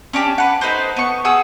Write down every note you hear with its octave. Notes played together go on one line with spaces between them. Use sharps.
C#4 D4 G4 D5
B4 F#5
D#4 A4 B4 C5
B3 C#6
G#4 F#5 D#6 E6